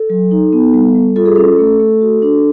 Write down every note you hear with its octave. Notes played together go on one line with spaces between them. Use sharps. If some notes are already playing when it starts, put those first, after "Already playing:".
Already playing: A4
F#3
D#4
B3
G3
G3
F4 A4
G#4
C#4 A4
A3
A3
F#4
D4